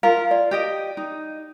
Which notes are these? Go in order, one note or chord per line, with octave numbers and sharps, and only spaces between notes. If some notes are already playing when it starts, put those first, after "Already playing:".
F4 A#4 F5
F4 D5
G4 D#5 G5
D#4